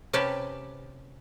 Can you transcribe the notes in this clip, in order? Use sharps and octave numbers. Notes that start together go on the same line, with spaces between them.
C3 C#4 G4 B4 A5